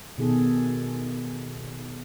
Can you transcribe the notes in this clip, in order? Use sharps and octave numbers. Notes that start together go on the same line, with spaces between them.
B2 D#3 G#4 A4